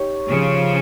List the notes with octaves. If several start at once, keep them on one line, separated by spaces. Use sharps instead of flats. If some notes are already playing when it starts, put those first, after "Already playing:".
Already playing: D#4 G4 C#5
C#3 F3